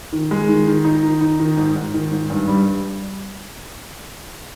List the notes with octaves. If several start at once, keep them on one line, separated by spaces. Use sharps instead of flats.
D#3
G#3
D#3
D#3
D#4
D#3
D#4
D#3
G#2
G#2
D#3
G#2
G2
G3
G3